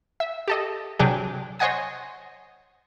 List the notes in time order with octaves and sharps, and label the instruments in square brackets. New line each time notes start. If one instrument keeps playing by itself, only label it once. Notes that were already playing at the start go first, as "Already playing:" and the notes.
[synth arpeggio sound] E5
G4 A4 D#5
C3 F#3 D4 G4 G#4
C5 C#5 D#5 F#5 G#5 D#6